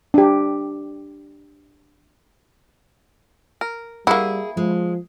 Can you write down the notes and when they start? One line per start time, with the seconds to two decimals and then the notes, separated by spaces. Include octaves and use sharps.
0.14 D4 G4
3.61 A#4
4.07 G3 A#3 E4 F#4 G#4
4.57 F3 G#3